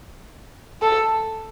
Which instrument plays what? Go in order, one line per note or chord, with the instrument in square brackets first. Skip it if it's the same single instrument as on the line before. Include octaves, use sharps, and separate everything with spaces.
[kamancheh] A4